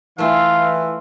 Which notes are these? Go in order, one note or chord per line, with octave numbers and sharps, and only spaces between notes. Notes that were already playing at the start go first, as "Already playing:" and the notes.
E3 A3 F4 F5